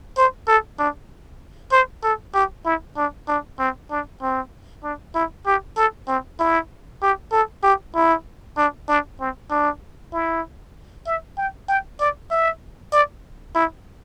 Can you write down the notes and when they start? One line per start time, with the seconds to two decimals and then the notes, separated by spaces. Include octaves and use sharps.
0.17 C5
0.48 A4
0.79 D4
1.72 C5
2.03 A4
2.34 G4
2.65 E4
2.97 D4
3.28 D4
3.59 C4
3.91 D4
4.22 C4
4.84 D4
5.15 E4
5.46 G4
5.77 A4
6.08 C4
6.40 E4
7.02 G4
7.32 A4
7.63 G4
7.95 E4
8.57 D4
8.89 D4
9.20 C4
9.51 D4
10.13 E4
11.07 E5
11.38 G5
11.69 G5
12.00 D5
12.31 E5
12.93 D5
13.55 E4